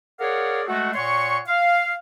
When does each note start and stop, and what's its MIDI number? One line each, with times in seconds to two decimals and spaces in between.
0.19 0.62 68
0.19 0.62 70
0.19 0.62 73
0.19 0.62 74
0.19 0.62 77
0.19 0.62 78
0.67 0.91 56
0.67 0.91 57
0.67 0.91 66
0.95 1.38 46
0.95 1.38 73
0.95 1.38 78
0.95 1.38 84
0.95 1.38 85
1.47 1.94 77